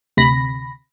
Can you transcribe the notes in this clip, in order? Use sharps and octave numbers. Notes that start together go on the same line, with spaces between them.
D2 C3 B5 A#6